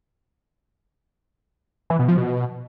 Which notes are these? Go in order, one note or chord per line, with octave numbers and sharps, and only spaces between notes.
E3
B2
F3
B2